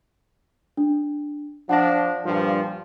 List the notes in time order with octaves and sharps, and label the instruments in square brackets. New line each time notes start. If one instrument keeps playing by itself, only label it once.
[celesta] D4
[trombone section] F3 D4 [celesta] F#5 A5 A#6
[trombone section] G2 A#2 F3